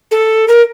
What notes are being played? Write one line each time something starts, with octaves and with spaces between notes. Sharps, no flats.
A4
A#4